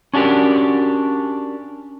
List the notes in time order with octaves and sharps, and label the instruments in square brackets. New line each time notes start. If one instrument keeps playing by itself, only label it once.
[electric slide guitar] C#4 D4 F#4 G4 A#4